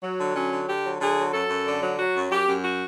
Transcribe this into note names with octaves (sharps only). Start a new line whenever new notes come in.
F#3
D3
F#3 C#4
D3
D3 G4
F#3
D3 G#4
F#3
F#2 A4
F#2
D3
F#3
F#3 F#4
F#2
F#2 G4
F#2
F#4